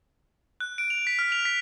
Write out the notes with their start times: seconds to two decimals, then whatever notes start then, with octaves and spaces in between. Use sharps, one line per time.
0.60 F#6
0.78 D7
0.90 F7
1.07 B6
1.19 F6
1.32 F7
1.45 B6